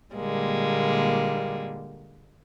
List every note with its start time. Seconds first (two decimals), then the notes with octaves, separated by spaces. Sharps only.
0.13 A#2 D3 G3 G#3 A#3